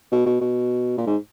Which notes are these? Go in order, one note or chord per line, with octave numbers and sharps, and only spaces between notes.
B2
B2
B2
A#2
G#2